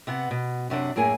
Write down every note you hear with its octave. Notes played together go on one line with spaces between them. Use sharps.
C3 B3 F#5
B2
F#2 C3 D4 F#5
F#2 A2 A#3 G#4 G#5